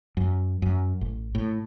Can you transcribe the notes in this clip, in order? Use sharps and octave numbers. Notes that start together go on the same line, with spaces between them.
F#2
F#2
A1
A2